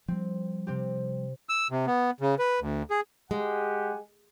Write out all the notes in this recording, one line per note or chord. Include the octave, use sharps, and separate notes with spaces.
F3 G3 C4
C3 C4 G4
E6
C3
B3
C#3
B4
D2
G#4
G#3 G4 F#5 G#5